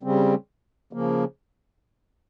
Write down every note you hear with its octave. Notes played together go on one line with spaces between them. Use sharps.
C#3 G3 C4
C#3 F3 A#3